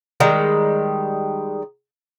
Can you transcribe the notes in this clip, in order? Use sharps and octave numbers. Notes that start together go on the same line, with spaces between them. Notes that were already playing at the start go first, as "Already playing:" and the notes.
D#3 G3 G#3